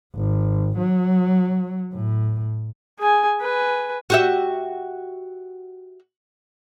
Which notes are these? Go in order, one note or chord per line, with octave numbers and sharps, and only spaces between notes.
G#1
F#3
A2
G#4 G#5
B4 G#5
F#4 G4 E5